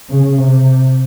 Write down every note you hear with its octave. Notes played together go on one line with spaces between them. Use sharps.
C#3
C3